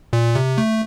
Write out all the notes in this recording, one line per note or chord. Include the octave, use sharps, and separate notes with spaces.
A#2
C3
A3